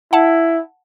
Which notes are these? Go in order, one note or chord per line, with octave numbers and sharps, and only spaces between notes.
E4 F#5 A5